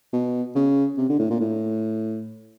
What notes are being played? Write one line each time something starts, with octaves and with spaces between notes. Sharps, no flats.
B2
C#3
C3
D3
A2
A#2
A2